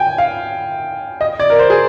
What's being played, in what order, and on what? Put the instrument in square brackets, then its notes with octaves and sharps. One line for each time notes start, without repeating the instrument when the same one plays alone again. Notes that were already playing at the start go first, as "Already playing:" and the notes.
Already playing: [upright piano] G5 G#5
F5
D#5
D5
A#4
C5
G#4